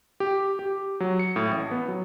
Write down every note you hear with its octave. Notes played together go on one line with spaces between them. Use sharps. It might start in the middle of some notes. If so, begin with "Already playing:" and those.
G4
G4
F#3
C#7
A2
A1
B3
F#3